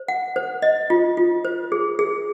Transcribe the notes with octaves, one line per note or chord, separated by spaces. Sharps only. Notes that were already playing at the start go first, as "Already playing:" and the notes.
Already playing: C5
F#5
C5
D#5
F4
F4
C5
G#4
G#4